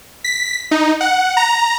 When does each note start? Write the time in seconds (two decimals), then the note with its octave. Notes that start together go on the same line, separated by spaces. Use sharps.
0.24 B6
0.71 D#4
1.01 F#5
1.37 A#5